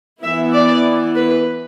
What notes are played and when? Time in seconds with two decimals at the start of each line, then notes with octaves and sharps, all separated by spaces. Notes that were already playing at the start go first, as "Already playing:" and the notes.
0.22 E3 B3 E4 E5
0.53 D5
1.15 B4